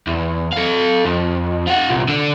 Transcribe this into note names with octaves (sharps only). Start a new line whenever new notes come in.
E2
A4 F5
F2
F4 F#5
C2 A#2
D3 D4